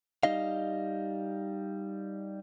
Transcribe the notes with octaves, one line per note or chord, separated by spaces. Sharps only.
G3 D#4 D#5 F5